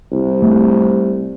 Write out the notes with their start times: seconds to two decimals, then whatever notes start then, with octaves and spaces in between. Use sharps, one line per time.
0.12 C2
0.42 A3